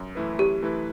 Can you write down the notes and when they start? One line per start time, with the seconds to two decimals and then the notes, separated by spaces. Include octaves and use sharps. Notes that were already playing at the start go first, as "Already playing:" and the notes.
Already playing: F#2
0.15 E3 A3 E4 B4
0.38 F#2 G4
0.62 E3 A3 E4 B4